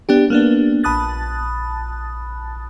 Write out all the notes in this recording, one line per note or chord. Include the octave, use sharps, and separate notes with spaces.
B3 D4 G4
A#3 B3 D4
A#1 A5 B5 D#6 F#6 A6